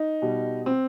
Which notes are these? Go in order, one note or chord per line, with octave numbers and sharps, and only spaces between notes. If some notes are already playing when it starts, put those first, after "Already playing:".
Already playing: D#4
B2 G3
C4